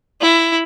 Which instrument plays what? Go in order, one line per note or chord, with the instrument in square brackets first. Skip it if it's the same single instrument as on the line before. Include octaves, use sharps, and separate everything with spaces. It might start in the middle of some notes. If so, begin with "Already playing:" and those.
[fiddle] E4